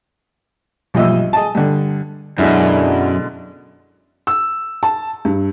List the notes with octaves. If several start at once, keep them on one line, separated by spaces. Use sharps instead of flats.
B1 G2 F3 D#5 E5 E6
G#4 D#5 A5
G2 D3
F#2 B2 D3 G#3 D4 E4
E6
A5
G2